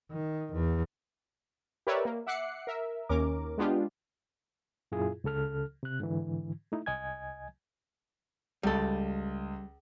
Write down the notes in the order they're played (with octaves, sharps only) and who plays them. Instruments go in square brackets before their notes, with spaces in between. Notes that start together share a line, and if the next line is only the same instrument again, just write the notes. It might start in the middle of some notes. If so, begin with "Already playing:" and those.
[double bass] D#3
E2
[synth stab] G4 A#4 B4 C#5 D5 E5
A#3
E5 F#5 D6 F#6 C7 C#7
A#4 E5
D#2 C#4 A#4 D6
G#3 B3 D4 F4 G4
[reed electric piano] F#2 A#2 E4 F4 G#4
C#2 C#3 A4 F6
C3 F#6
G#2 D3 E3
A3 D#4 E4
C2 D#5 G#5 G#6
[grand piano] C#2 [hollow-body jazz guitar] G3 A4